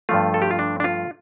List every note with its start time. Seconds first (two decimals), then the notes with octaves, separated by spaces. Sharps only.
0.09 G2 F3 A3 F4
0.34 A4
0.42 G4
0.51 F4
0.59 D4
0.80 D4
0.84 F4